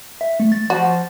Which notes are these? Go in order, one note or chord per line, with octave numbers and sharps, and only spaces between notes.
E5
A3
A6
F3 F#4